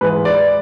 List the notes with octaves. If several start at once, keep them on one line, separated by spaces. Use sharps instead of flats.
G#2 E3 G#3 B4
D5